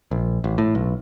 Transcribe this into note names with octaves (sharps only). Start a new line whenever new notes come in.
A#1
A1
A2
B1